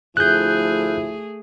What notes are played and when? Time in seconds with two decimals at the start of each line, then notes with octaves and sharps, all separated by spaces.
0.17 D2 F3 A3 E4 G#4 F#6 G6